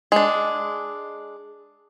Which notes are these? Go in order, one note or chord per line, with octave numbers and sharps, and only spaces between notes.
G#3 D4